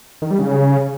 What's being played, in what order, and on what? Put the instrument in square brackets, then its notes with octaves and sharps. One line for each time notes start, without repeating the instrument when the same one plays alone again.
[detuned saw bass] D#3
G3
C#3